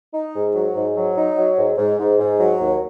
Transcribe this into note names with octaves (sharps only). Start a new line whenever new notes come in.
D#4
G#2
F#3
G#2
F#3
D#4
F#3
G#2
G#2
G#2
G#2
F#3
D#2